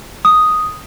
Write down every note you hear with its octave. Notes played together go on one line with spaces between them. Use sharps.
D#6